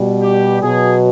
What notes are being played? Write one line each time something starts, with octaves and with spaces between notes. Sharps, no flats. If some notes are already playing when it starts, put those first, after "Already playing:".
Already playing: B2 G3
G4
B2 F#3 G#4